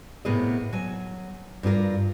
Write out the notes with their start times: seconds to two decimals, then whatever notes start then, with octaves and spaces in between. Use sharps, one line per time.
0.25 A2 C3 B3 G#4 A#4 D#5
0.73 F#3 G#5
1.63 G2 D4 F4 A#4